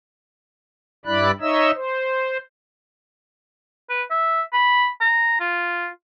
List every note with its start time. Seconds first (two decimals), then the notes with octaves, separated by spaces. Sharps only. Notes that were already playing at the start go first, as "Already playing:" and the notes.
1.05 G2 G3 E4 D5 B5 F#6
1.40 D#4 C#5 D#5 E5 E6
1.75 C5
3.90 B4
4.11 E5
4.53 B5
5.01 A#5
5.40 F4